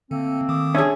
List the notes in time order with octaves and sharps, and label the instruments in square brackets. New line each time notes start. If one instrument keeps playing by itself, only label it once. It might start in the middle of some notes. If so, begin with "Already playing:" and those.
[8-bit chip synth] D3 [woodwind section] A3 A#3 C4
[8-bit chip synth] D#3 D6 D#6
[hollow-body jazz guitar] C#4 G#4 [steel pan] D4 E5